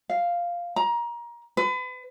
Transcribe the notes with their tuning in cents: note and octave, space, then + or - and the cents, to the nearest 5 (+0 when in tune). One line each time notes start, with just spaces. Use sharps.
F5 -5
A#5 +25
B4 +35